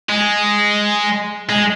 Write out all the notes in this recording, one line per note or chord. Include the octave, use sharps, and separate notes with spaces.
G#3
G#3